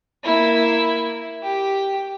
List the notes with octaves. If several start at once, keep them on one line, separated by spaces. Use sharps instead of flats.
A#3 E4
G4